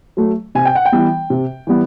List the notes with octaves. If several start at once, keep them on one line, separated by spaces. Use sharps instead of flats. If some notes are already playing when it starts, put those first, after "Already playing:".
F#3 A3
C3 G#5
G5
F#5
G5
E3 G3 B3
C3
E3 G3 B3